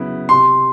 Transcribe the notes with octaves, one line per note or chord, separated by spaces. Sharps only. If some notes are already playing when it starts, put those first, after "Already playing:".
Already playing: C#3 F#3 B3 E4
C3 C6